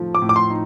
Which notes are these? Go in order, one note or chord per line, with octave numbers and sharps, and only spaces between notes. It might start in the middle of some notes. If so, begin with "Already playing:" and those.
Already playing: A2 F3 A3 D#4
D6
A2
D6
C6
D#4